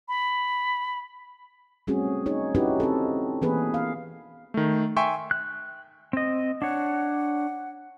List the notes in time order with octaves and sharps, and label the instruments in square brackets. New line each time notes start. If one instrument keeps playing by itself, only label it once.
[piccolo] B5
[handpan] G3 A3 C4 C#4 F#4 G#4
D#4 G#4 C#5
C#4 D#4 E4 F#4 G4 B4
C4 C#4 A4
E3 A#3 B3 G#4 B4
F5
[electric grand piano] D#3 A3
E5 G5 G#5 C6 C#6
[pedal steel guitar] F#6
C4 D#5
[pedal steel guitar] D4 C#5 [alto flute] F#5